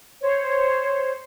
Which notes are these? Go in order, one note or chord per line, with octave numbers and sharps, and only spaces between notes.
C5 C#5